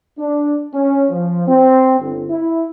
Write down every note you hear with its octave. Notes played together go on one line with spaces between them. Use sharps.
D4
C#4
F3
C4
G1
E4